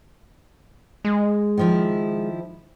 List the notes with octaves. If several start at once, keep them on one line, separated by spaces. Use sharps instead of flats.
G#3
D#3 F3 E4